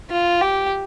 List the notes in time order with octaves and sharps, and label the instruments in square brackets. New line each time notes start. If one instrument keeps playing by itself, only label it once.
[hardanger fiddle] F4
G4